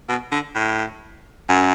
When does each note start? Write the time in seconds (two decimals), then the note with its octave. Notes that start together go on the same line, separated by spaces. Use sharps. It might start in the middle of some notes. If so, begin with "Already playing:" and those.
0.09 B2
0.32 D3
0.56 A2
1.49 F#2